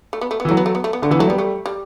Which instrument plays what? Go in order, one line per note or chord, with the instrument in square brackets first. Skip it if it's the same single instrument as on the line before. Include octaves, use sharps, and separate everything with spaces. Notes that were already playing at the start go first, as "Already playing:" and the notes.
[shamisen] A3
B3
A3
B3
[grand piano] E3
[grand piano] F#3 [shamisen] A3
[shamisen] B3
A3
B3
A3
B3
[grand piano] D3 [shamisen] A3
[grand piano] E3 [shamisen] B3
[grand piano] F#3 [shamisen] A3
[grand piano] G3 [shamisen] B3
[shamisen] A3
G3